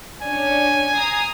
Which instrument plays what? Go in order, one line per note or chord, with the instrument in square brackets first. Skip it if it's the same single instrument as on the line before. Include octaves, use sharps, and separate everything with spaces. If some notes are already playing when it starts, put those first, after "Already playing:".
[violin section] C#4 D4 [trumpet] G#5
[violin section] A#5 D#6 C7